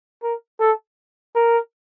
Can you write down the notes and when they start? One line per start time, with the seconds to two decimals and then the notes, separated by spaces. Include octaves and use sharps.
0.23 A#4
0.60 A4
1.36 A#4